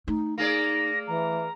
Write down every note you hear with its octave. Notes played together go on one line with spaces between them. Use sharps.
A3 D#4
A#3 D#4 G#4 D5 A#6
E3 A#5